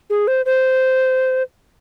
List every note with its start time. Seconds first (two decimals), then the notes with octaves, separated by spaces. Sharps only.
0.10 G#4
0.27 C5
0.46 C5